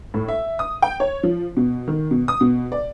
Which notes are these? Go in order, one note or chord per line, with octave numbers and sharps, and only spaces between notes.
A2
E5
D#6
G5
C#5
F3
B2
D#3
B2
D#6
B2
D5